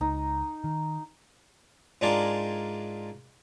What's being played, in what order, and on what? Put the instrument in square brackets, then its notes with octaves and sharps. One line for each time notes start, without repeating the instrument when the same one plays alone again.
[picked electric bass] C#2 [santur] D#4
[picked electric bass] D#3
[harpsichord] G#2 G#3 D4 F4 A#4 D5